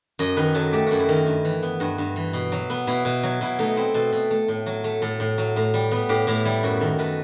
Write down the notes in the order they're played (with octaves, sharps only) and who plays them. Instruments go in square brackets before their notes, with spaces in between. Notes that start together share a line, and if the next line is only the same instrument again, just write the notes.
[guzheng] F#2 D#5
D#3 B4
F#3 A4
A3 G4
F#2 F#4
E4
D#3
G2
E3
B3
G2 F#4
G2
E3
B2
F#3
B3
B2 E4
B2
F#3
B2 E4
A3 D#4
C4 E4
B2 A4
B2
A3
A2
F#3
A3
A2 A4
A2
F#3
A2
G3
B3
A2 G4
A2 E4
G3 E4
F#2 F#4
D#3 A4
A3 B4